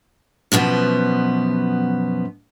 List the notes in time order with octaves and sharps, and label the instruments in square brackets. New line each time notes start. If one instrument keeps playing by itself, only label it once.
[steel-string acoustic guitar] F#2 B2 F3 B3